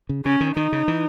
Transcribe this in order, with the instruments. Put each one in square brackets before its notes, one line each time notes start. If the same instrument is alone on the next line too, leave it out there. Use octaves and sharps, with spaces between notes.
[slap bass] C#3
[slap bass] C#3 [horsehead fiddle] C#4
[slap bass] D#3
[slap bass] D#3 [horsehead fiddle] D#4
[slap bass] C#3
E3